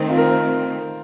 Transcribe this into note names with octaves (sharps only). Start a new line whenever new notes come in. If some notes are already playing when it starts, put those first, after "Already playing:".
Already playing: D#3 A3 C4
F4
A#4
C5